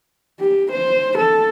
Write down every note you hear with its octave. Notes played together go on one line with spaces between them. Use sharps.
G4
C5
A4